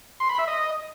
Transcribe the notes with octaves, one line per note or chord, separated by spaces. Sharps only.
C6
B5
E5
D#5